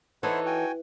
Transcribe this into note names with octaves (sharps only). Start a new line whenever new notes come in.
E3 D#4 E4 A4 C5 C#5 F#5
F#4 G5 G#5